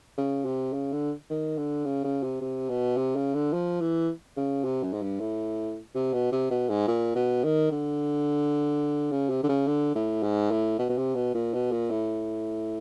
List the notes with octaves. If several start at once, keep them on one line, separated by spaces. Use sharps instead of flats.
C#3
C3
C#3
D3
D#3
D3
C#3
C#3
C3
C3
B2
C3
C#3
D3
F3
E3
C#3
C3
F#2
G#2
G2
A2
C3
B2
C3
B2
G#2
A#2
B2
D#3
D3
C#3
C3
D3
C#3
D3
A2
G#2
A2
B2
B2
C3
B2
A#2
B2
A#2
A2